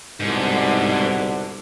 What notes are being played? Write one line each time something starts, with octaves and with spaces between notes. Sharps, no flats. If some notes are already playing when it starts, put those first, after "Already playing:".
C2 G#2 B2 D3